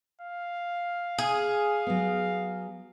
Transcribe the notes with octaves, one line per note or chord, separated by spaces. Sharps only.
F5
G#4
F#3 B3